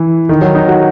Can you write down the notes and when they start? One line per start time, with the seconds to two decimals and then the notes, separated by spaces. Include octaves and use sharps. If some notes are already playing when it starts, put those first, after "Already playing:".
Already playing: E3
0.29 D#3
0.41 F#3
0.55 D#4
0.68 F#4